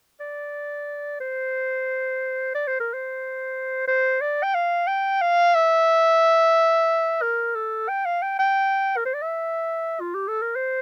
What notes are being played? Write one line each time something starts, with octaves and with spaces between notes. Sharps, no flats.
D5
C5
D5
C5
A#4
C5
C5
D5
G5
F5
G5
F5
E5
A#4
A4
G5
F5
G5
G5
A#4
C5
D5
E5
F4
G4
A4
A#4
C5